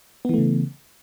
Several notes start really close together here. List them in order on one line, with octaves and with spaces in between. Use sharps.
B3 E3 A3 C#3